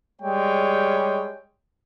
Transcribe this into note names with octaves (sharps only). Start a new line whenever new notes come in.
G3 G#3 C#5 G5